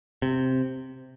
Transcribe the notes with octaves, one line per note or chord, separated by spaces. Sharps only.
C3